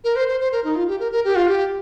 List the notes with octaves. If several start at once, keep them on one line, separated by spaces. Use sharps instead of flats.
A#4
C5
C5
C5
A#4
D#4
F4
G4
A#4
A#4
G4
F4
G4